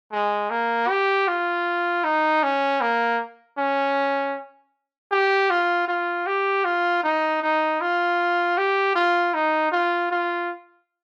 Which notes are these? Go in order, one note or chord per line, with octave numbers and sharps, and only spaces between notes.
G#3
A#3
G4
F4
D#4
C#4
A#3
C#4
G4
F4
F4
G4
F4
D#4
D#4
F4
G4
F4
D#4
F4
F4